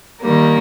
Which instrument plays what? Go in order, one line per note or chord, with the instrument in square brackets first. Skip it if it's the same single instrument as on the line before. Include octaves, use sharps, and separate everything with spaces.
[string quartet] D#3 G3 A#3